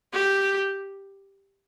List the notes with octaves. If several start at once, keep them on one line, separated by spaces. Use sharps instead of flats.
G4